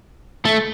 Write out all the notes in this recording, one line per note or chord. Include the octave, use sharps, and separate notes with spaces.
A3